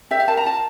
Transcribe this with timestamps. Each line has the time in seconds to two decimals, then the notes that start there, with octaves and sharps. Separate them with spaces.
0.11 G4 E5
0.20 F5
0.28 A#4 A5
0.37 A#5
0.45 F4 A5